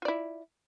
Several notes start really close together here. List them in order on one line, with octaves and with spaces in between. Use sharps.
F4 D5 E4